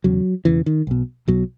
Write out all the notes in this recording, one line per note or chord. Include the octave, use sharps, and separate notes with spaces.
E1 E2 C#3 F#3
E1 E2 C#3 E3
D#3
B1 B2
B1 B2 F#3